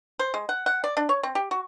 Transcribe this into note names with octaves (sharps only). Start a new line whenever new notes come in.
C5
G#3
F#5
F#5
D5
D4
C#5
C4
G4
F#4